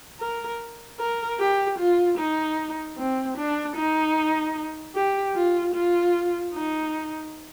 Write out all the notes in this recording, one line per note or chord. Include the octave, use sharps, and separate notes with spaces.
A#4
A#4
G4
F4
D#4
C4
D4
D#4
G4
F4
F4
D#4